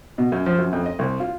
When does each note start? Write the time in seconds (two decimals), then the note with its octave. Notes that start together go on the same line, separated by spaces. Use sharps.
0.18 B2
0.32 F#2
0.46 F3
0.58 F#2
0.73 F2
0.86 D#5
0.99 C2
1.20 F4